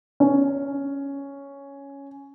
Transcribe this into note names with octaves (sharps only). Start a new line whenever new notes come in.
C#4